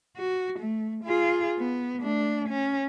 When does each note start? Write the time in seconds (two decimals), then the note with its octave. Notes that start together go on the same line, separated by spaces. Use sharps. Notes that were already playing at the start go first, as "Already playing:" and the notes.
0.16 F#4
0.59 A3
1.04 F4 G#4
1.59 B3
2.02 A3 D4
2.49 C#4